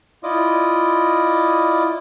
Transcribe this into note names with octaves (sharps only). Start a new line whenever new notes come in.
E4 F4 D5 D#5